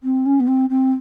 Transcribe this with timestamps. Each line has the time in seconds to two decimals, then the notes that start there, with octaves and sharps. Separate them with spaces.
0.03 C4
0.25 C#4
0.40 B3
0.47 C4
0.69 C4